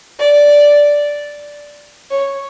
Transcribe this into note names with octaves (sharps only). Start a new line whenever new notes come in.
D5
C#5